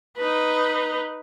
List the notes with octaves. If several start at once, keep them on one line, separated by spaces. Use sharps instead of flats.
D#4 B4